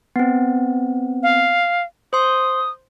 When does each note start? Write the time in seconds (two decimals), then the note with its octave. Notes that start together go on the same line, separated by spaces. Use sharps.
0.16 B3 C4
1.23 F5
2.13 C5 C6 D#6